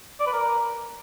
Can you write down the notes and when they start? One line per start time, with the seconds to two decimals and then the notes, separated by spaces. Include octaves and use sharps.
0.20 D5
0.27 B4
0.33 A#4